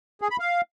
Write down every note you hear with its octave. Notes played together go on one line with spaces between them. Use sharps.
G#4
B5
F5